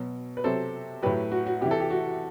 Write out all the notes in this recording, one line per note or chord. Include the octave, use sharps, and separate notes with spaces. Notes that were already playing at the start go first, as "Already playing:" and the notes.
Already playing: B2 F#3
B4
C3 F#3 A4 C5
A2 F#3 G4 B4
F#4
F#4
C3 E3 G4
A4
G4
F#4